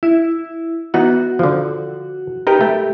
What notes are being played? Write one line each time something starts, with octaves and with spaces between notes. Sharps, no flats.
E4
E3 B3 D#4 F#4
D3 F3
D#4 G4 A#4 B4
A3